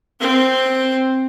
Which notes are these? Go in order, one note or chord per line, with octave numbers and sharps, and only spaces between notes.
C4